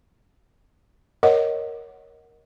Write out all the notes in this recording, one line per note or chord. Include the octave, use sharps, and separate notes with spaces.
A#4 C#5 D#5 F#5